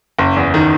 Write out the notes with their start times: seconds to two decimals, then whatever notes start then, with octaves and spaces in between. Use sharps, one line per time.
0.19 F#1
0.36 E2
0.54 D#3